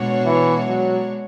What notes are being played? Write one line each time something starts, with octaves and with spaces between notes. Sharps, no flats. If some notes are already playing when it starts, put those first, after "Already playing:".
Already playing: B2 G#3 D4 F#4 C#5
E3
F#3